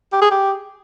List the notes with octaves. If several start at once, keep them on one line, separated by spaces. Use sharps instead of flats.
G4
G#4
G4